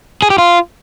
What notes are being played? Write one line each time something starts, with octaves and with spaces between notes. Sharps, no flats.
G#4
G4
F4